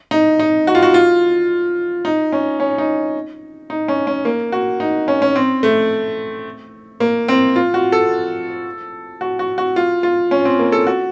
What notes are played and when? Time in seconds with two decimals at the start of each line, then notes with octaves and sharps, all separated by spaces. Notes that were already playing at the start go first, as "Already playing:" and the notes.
0.11 D#4
0.39 D#4
0.67 F#4
0.75 F4
0.83 F#4
0.94 F4
2.05 D#4
2.32 C#4
2.60 C#4
2.78 D#4
3.70 D#4
3.88 C#4
4.07 C#4
4.25 A#3
4.52 F#4
4.80 D#4
5.08 C#4
5.22 C#4
5.36 C4
5.63 A3
7.00 A#3
7.28 C4
7.56 F4
7.74 F#4
7.92 A4
9.21 F#4
9.39 F#4
9.58 F#4
9.76 F4
10.03 F4
10.31 C#4
10.45 C4
10.59 A#3
10.72 A4
10.87 F#4